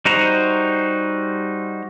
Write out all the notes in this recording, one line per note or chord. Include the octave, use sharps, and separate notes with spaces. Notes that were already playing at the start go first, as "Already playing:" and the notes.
G3 D#4 F#4 C5 A#5